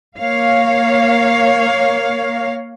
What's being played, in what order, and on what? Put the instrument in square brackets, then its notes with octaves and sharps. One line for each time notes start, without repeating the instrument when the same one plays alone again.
[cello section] A#3 C#5 F5